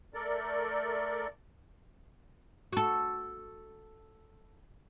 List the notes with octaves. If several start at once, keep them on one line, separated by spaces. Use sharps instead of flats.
A3 A4 A#4 D5
F#4 A4